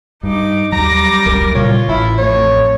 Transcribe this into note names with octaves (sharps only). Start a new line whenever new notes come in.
G2 D#4 D6
D#2 F#3 G3 A#5 D6 A#6
F1 C#2 F#3 A#4
A#2 C#3 G3 F4 C#5
A1 E4
F2 A2 C#5